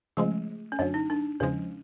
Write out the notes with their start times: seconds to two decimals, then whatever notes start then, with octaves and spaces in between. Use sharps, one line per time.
0.17 C#3 F3 G#3 A3
0.72 C#4
0.79 F#2 D3 F#3 D4
0.94 D#4
1.10 D4
1.40 E2 C#3 F3 G#3 C#4